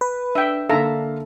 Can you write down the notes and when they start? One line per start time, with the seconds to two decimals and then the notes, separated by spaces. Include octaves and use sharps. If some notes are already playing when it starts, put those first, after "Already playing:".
0.01 B4
0.35 D4 E5 G5
0.69 D3 A#3 A4 E5 F5 A#5